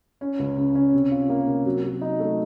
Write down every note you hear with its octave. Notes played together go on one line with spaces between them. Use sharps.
C#4
C#2
C#3
C#4
C3
F4
A#3
C3
F#3
F#3
D#4
A3